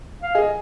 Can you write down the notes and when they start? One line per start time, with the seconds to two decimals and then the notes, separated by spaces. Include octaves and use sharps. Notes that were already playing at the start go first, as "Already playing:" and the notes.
0.22 F5
0.35 G#4 D#5